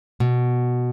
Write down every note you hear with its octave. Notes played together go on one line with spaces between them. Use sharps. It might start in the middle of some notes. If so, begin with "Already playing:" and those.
B2